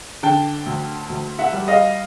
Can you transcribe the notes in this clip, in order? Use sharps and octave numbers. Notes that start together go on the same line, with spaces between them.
D3 G5 A5
D2
D2
E5 F#5
G3
D#5 F5